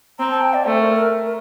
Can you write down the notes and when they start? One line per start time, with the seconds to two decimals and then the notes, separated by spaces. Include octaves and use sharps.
0.19 C4 A#5
0.31 A5
0.42 G5
0.54 D5
0.65 A3 C5
0.80 A#4
0.95 A#4
1.25 A#4